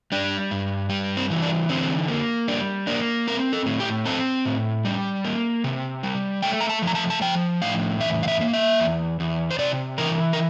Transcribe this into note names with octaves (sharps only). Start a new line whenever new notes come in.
G3 D4
G2
G3
C4
E3
D4
D3 C4
A#3
G3 D4
A#3 D4
C4 A#4
A4
A2
G4
C4 A4
A2
G3
A#3
C3
G3
A3 G5
A#5
A5
F3
A#5
A5
A5
F3 G5
A2 F5
E2 E5
F5
E5
A#3
E5
E2
E2
C5
C3 D5
E3 A#4
A#4